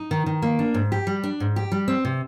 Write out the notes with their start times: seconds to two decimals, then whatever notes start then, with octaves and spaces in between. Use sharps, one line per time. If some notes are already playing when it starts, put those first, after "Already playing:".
Already playing: D#4
0.11 D#3
0.26 D#3
0.42 A#3
0.59 D4
0.74 G#2
0.92 G4
1.07 G3
1.23 D4
1.40 G#2
1.56 G4
1.72 G3
1.88 C4
2.05 C3